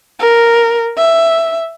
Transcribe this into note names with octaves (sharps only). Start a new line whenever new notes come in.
A#4
E5